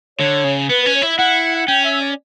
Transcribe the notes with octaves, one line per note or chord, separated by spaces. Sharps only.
D3 C#5
C#3
B3 B4
B4
C#4
C#5
E4 E5
E4 F#5
F#5
C#4 G5
E5
D5